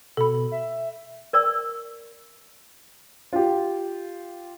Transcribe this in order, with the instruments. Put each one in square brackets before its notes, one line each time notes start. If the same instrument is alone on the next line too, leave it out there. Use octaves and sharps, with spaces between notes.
[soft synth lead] B2 [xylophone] A4 B5
[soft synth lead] E5
[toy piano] A#4 D5 C#6 E6
[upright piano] F4 G4